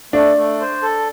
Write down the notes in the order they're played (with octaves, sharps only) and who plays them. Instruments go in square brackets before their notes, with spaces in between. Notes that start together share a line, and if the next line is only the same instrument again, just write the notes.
[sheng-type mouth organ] A3 [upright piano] D4
[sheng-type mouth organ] A3
C5
A4